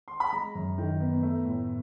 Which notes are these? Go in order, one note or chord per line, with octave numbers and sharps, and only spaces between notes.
C6
B5
G#3 A#5
F#2
D#3
B3
A3
A2